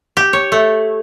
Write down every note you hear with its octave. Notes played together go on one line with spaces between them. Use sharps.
G4
C#5
A3